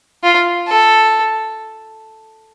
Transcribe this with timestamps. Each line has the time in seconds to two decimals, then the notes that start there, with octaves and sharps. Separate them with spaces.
0.23 F4
0.68 A4